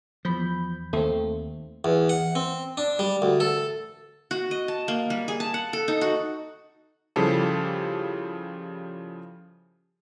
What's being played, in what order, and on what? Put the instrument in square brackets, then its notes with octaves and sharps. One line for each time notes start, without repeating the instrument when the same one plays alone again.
[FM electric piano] E2 B5 G6 [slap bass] F3
[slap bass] D#2 [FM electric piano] A3 C4
[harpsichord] E2
F#5
C4
D4
G3
D2
A4
[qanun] F#4
D#5
A5
A#3
G3
G#4
A5
F#5
A4
D#4
F#4
[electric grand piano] C#3 F3 G3 E4 G4 A4